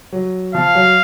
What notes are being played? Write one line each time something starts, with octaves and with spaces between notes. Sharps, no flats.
F#3
F3 F5
F#3